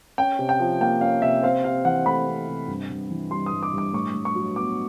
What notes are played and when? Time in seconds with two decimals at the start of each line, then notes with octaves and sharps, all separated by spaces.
0.18 C#4 G5
0.39 C3
0.49 G5
0.60 F3
0.81 A#3 G5
1.01 C#4 F5
1.22 C3 E5
1.43 C4 F5
1.64 C3 F5
1.85 E3 F#5
2.06 A3 B5
2.27 C4
2.48 C3
2.68 G2
2.90 G2
3.11 E3
3.31 G3 C6
3.46 D#6
3.53 G2
3.63 D6
3.73 G2 D6
3.93 A2 C#6
4.14 A2
4.25 C#6
4.35 F#3
4.56 B3 D6